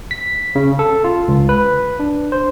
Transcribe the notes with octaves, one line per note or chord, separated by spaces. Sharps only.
B6
C#3
A4
F4
C#2
B4
D4
C5